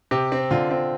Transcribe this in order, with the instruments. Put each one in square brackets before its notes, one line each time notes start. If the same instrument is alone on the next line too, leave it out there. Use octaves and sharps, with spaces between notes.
[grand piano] C3 G4
C4
D3 F4
C4